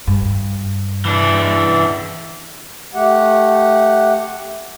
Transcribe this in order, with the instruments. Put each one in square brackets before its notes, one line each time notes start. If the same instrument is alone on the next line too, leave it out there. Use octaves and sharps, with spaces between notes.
[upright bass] G2
[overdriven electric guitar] E3 D4
[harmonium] A3 G4 F#5